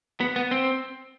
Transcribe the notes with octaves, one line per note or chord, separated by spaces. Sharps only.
B3
B3
C4